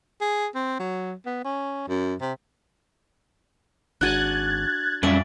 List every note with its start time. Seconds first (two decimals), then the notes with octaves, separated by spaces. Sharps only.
0.21 G#4
0.55 C4
0.79 F#3
1.26 B3
1.44 C#4
1.88 F#2
2.21 C3
4.01 G#1 D4 F#4 G#5 F#6 G#6 A6
5.03 F2 G3 C#4 D5 E5